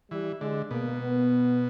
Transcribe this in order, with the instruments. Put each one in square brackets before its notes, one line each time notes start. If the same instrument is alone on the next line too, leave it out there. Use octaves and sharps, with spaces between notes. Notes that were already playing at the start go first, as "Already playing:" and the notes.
[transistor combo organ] E3 [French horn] G3
[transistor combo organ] D3 [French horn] G#3
[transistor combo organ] B2 [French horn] A#3
[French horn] B3